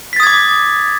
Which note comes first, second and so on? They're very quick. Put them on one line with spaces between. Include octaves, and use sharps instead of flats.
B6 A6 D#6 G#6 D6